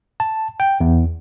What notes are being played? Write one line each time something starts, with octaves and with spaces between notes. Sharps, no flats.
A5
G5
E2